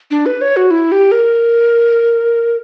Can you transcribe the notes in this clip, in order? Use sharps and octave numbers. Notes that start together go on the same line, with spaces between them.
D4
B4
C#5
F#4
E4
G4
A#4